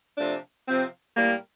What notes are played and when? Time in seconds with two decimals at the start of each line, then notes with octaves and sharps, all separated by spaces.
0.18 C3 F3 A3 D4
0.67 C3 F3 C4
1.17 A2 G3 A#3